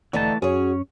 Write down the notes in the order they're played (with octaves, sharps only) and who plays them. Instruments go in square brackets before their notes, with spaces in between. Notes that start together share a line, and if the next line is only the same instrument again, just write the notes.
[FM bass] E1 [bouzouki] D3 D#4 G4 [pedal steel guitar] E3 A3 A5
[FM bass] F#2 [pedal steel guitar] C#4 [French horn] F#4 [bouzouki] G#4 C#5